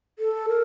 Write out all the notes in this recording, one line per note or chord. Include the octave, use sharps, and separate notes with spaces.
A4
A#4